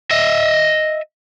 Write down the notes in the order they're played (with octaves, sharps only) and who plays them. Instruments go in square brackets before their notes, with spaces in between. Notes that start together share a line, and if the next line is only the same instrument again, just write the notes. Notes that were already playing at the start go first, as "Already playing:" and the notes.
[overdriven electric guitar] D#5 E5